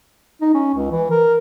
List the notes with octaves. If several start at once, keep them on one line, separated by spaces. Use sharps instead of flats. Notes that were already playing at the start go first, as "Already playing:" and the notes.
D#4
C#4
C#2
E3
A#4